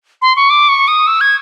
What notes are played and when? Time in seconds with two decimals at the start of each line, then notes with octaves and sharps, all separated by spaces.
0.22 C6
0.36 C#6
0.50 D6
0.69 C#6
0.88 D#6
1.07 E6
1.21 G#6